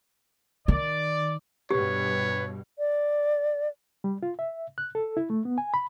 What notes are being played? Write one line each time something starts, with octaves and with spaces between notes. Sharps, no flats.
D#3 D5
G2 B2 G4 B4 C#5
D5
G3
F4
E5
F#6
A4
E4
A3
B3
G#5
B5